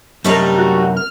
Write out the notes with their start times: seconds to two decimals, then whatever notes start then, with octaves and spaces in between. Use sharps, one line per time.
0.25 F#2 C3 G3 A3 D#4 A#4
0.58 F#4
0.97 F6